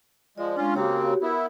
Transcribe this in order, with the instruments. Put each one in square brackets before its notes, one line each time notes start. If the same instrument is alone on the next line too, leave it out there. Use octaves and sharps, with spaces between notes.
[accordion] F3 G#3 [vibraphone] D5
[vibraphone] G#3 D4 [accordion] C#4 F4
[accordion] C#3 A#3 C4 [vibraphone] F#4 G4 C#5
[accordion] B3 E4 [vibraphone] A#4